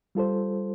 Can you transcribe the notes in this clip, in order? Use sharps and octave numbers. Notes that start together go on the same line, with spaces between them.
G3 F4 A4 C5